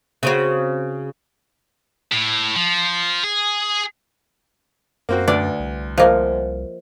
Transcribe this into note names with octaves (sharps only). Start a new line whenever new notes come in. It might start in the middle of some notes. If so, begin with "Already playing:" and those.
C#3 C4 F#4
A2
F3
G#4
F#2 A#3 C4 F#4
D2 D4 B4 D5 E5
C2
F3 A#3 C5 D#5 E5